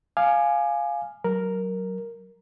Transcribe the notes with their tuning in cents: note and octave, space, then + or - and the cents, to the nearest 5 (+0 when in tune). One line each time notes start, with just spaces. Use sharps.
F5 +0 G#5 +5 D6 +35
F#3 +20 A#4 +0